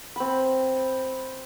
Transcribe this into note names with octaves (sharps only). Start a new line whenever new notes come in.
C4 B5